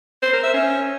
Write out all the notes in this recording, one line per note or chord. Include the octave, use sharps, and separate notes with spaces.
C5
A#4
E5
C#4